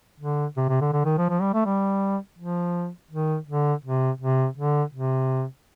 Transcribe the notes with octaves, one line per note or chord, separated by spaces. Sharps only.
D3
C3
C3
D3
D3
D#3
F3
F3
G3
A3
G3
F3
D#3
D3
C3
C3
D3
C3